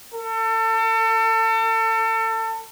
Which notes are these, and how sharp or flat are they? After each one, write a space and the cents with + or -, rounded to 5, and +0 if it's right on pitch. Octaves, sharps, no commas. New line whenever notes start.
A4 +35